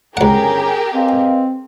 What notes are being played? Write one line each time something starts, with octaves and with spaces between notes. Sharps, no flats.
G1 C#2 C#4 G4 G#4 A#4 F#5 A#5
C4 B4 D#5 F5